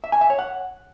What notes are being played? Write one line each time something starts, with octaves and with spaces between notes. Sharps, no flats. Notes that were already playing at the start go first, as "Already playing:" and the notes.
E5
G#5
E5
C#5
F#5